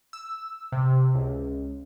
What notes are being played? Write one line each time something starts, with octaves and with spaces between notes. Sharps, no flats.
E6
C3
C#2